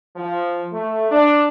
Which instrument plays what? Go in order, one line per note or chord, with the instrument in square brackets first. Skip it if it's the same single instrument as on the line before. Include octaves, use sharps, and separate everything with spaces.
[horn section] F3
A3
D4